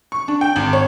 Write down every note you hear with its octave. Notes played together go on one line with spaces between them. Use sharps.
C#6
D4
G5
G#1
C#5